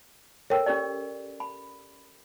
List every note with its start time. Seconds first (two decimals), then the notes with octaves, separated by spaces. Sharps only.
0.50 A4 A#4 C#5 G5
0.66 C#4 G4 D5
1.40 B5